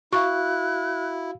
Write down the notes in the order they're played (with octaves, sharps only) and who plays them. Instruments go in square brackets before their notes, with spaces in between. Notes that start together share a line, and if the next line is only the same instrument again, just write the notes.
[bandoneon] E4 [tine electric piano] F#4 F5 [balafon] C#6 [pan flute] F#6